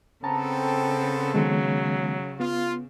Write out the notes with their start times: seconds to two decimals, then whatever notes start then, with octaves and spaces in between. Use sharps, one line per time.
0.24 C#3 B3 C4 A4 A5 A#5
1.34 D#3 F#3 G#3 B3
2.40 B3 F4